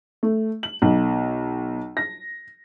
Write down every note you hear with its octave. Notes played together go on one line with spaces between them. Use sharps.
A3
F#7
B1
A#6